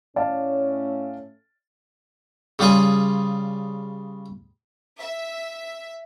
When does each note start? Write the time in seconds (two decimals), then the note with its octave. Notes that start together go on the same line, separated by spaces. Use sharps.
0.16 A2 A3 C#4 D5 F5 A5
2.59 C#3 G3 F4 G#4 G#5
4.99 E5